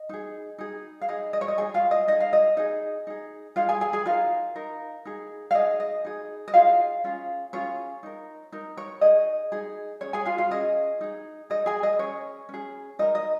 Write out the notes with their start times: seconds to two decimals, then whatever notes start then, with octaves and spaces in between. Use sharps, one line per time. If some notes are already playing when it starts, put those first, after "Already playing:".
Already playing: D#5
0.09 D#4 G#4
0.58 D#4 G#4
1.02 F5
1.08 D#4 G#4 D#5
1.33 D#5
1.41 C#5
1.48 D#5
1.58 D#4 G#4 G#5
1.74 F4 F5
1.91 D#5
2.08 D#4 G#4 D#5
2.20 F5
2.33 D#5
2.57 D#4 G#4 D#5
3.07 D#4 G#4
3.56 D#4 F4 G#4 F5
3.69 G#4 G#5
3.81 G#4 G#5
3.93 G#4 G#5
4.06 D#4 F4 A#4 F5
4.56 D#4 A#4
5.05 D#4 G#4
5.51 F5
5.54 D#4 G#4 D#5
5.80 D#5
6.05 D#4 G#4
6.48 D#5
6.54 D#4 F4 G#4 F5
7.04 C#4 F4 G#4
7.53 C#4 F4 G#4 C#5
8.03 D#4 A#4
8.52 D#4 A#4
8.77 C#5
9.01 D#4 G#4 D#5
9.52 D#4 G#4
10.01 C#4 G#4 C#5
10.13 G#4 G#5
10.25 F4 F5
10.38 F4 F5
10.51 C#4 G#4 D#5
11.01 D#4 G#4
11.50 D#4 G#4 D#5
11.66 G#4 G#5
11.83 D#5
11.99 C#4 G#4 C#5
12.49 C#4 G#4
12.99 D#4 A#4 D#5
13.15 D#5